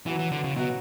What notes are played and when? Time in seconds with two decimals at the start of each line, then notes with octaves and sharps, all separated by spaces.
0.06 E3 F#3 B3 F#4
0.19 E3
0.32 D3
0.44 C#3
0.56 B2 F#3 B3 F#4